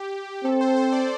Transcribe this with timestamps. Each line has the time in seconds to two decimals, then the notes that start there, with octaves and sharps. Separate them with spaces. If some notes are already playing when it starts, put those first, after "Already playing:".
Already playing: G4
0.44 C4 A4
0.61 C5
0.76 C5
0.92 D5